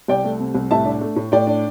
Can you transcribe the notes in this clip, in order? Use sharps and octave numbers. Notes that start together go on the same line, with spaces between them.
C2 D5 G5
A3
C3
C2
A2 E5 A5
D4
A3
A2
A2 D5 G5
D4